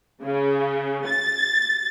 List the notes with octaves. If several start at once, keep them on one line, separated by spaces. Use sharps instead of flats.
C#3
A6